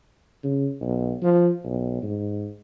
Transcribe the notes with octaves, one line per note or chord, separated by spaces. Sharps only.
C#3
B1
F3
B1
G#2